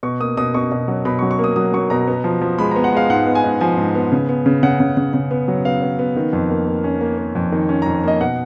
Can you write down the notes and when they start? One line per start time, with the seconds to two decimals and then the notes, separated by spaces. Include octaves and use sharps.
0.03 B2 C#6
0.20 A#3 D#6
0.37 B2 D#6
0.54 B2 C#6
0.71 B2
0.88 F#3
1.05 B2 B5
1.19 C#6
1.22 F#3
1.31 C#6
1.39 A#3 D#6
1.56 F#3 D#6
1.74 F#3 C#6
1.90 B2 A#5
2.07 B3
2.24 F3
2.41 F3
2.59 G#3 B5
2.71 B3 A#5
2.84 F#5
2.92 G#3 F5
3.10 G#2 F#5
3.27 B3
3.35 G#5
3.44 G#2
3.61 F3 G#5
3.78 G#2
3.95 B3
4.12 C#3
4.29 B3
4.46 C#3
4.63 C#3 F#5
4.80 C#3
4.97 C#3
5.14 C#3
5.31 B3
5.48 F#3
5.65 B3 F5
5.82 B3
5.99 B3
6.16 D#3
6.33 F2
6.50 A#3
6.67 A#3
6.84 C#4
7.01 A#3
7.18 A#3
7.35 F2
7.52 D#3
7.69 C#4
7.82 F2 A#5
8.04 A#3 D#5
8.20 B2 F#5